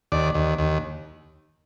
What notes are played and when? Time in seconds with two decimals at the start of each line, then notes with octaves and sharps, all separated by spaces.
0.12 D#2 D5
0.34 D#2
0.58 D#2